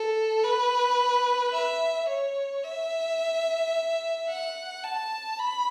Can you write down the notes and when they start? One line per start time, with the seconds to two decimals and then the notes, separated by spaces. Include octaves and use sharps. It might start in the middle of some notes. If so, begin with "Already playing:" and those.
Already playing: A4
0.44 B4
1.53 E5
2.09 C#5
2.64 E5
4.29 F#5
4.84 A5
5.39 B5